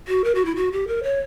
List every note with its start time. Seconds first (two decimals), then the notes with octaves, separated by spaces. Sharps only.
0.08 F#4
0.24 A#4
0.35 F#4
0.45 E4
0.56 F#4
0.72 G4
0.88 A#4
1.03 C#5